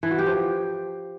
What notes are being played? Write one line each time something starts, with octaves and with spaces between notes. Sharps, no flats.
E3
F#4
G4
F3